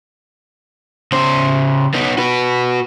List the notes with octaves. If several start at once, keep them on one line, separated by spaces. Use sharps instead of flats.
C#3 C5
B3 D#4
F#4 B4